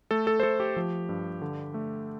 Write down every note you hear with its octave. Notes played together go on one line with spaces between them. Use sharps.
A3 A4
A4
C5
A3 A4
G4
F3
G2
D3
A3